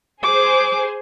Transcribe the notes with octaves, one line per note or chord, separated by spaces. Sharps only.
G#4 C5 D6